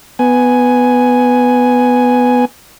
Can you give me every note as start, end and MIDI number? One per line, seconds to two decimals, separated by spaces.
0.19 2.45 59
0.19 2.45 80